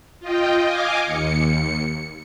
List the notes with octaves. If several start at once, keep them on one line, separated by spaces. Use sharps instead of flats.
F4 D#5 G5
D#5 F5 G#5 D6
D#2 C#7